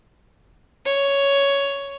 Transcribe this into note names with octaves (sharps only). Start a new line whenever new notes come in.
C#5